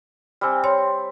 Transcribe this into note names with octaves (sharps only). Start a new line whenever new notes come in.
G3 C4 G#5 E6 F6
C#5 C6